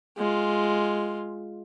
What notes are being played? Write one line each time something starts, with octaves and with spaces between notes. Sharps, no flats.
G#3 F4